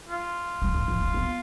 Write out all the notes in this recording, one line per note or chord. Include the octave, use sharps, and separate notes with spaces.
F4
G3
F3
F3
F3
B3